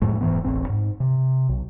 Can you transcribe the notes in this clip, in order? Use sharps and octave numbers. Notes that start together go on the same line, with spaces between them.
F2 A2 G#3
E1 G#2 E3 B3
E1 A1 C4
G#2
C3
B1